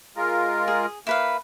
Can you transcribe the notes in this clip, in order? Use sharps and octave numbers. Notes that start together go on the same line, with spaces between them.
G#3 F4 A#4
G#4
A#3 E4 B4 F5